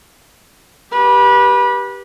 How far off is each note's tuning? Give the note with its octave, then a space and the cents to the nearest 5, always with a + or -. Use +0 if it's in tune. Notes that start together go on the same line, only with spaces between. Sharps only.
G4 +0 B4 -25